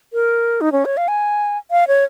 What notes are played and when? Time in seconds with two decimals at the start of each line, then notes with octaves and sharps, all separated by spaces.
0.13 A#4
0.61 D#4
0.72 C#4
0.85 C#5
0.97 F5
1.08 G#5
1.71 F5
1.88 C#5